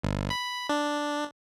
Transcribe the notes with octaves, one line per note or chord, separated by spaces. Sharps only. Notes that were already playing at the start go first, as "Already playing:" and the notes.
G1
B5
D4